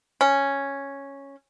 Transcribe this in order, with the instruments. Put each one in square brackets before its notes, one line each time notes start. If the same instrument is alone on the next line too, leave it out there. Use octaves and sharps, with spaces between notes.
[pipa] C#4